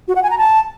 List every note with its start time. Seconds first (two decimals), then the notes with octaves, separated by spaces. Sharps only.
0.08 F#4
0.15 F#5
0.23 G#5
0.30 A#5
0.38 A5